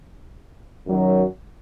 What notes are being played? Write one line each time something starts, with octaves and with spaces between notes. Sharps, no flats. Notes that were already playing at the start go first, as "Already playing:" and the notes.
F#2 D#3 F#3